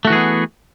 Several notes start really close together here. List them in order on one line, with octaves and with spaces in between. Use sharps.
A3 F#4 E3 G#4 B3